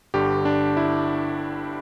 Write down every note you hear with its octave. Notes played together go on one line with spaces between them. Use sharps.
G1 G2 D3 G4
D4
E4